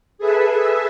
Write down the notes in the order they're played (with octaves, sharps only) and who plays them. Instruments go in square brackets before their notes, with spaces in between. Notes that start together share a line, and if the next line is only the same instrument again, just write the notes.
[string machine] G#4 A4 B4 E5